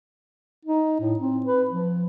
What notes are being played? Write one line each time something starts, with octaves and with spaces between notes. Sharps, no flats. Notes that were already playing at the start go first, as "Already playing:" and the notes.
D#4
A2
C4
B4
F3